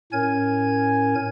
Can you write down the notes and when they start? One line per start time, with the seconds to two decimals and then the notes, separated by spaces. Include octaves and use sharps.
0.13 A2 C#4 A#4 C#5 G#5 G#6